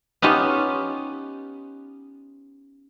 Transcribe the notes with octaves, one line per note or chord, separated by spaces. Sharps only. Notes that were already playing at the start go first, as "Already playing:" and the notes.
B3 C#4 D#4 F4 G4